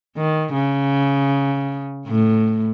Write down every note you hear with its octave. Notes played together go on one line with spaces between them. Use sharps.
D#3
C#3
A2